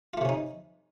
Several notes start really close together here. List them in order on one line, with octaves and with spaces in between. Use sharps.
F4 A3 C3 C#4 D#4